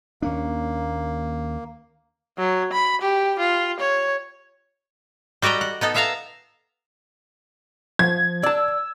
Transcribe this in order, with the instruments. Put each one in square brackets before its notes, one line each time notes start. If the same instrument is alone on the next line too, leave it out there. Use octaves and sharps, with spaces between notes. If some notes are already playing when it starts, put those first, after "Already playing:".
[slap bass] D#2 C#4 D4 [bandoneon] A#3
[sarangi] F#3
B5
G4
F4
C#5
[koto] G3 F#4 G4 D#5 A#5
F#5
B3 D#4 A4
B3 E5 F5 A5 A#5
[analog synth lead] F3 [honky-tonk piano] G#6
[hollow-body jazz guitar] D5 A5 [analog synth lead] E6